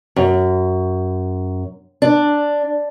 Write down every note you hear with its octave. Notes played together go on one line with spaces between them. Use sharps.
F#2
D4